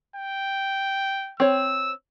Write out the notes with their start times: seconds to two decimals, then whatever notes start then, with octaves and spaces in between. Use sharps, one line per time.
0.16 G5
1.40 C4 C#5 E6